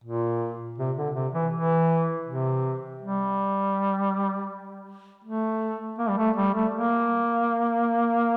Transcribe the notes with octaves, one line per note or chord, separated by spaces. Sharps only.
A#2
C3
D3
C3
E3
E3
C3
G3
A3
A#3
G3
A3
G3
A3
A#3